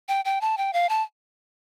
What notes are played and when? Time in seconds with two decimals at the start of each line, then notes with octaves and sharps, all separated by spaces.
0.08 G5
0.25 G5
0.41 A5
0.58 G5
0.73 F5
0.89 A5